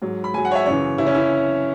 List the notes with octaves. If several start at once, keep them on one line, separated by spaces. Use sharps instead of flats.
G#2 F#3
B5
G#2 F#3 G#5
F#5
C#5
E5
F#2 C#3 E3 C#5
F#2 C#3 E3 E4
C#4
E4